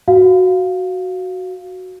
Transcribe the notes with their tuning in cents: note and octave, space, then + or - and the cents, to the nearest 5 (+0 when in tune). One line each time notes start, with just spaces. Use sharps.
F#4 +0 F5 +0